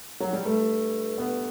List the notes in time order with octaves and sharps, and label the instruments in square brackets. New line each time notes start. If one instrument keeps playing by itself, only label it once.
[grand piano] F#3
G3
[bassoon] G2 [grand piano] A3
[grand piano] B3